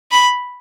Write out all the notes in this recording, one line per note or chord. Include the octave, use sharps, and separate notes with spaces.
B5